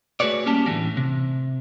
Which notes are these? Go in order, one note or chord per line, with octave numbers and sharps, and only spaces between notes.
A3 F#4 G#4 B4 C#5 D5
G3 A#3 C#4 G4 A5
A2 D3 E3 A#3
C3